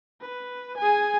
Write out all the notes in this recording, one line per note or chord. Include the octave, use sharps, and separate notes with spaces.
B4
G#4 G#5